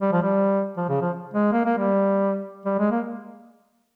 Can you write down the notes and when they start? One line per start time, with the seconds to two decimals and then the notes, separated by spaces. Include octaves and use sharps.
0.02 G3
0.12 F3
0.23 G3
0.77 F3
0.89 C#3
1.02 F3
1.34 G#3
1.52 A#3
1.65 A#3
1.78 G3
2.66 G3
2.79 G#3
2.91 A#3